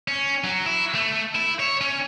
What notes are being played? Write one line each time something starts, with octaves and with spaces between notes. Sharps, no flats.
C#4
F#3
E4
A3
E4
C#5
C#4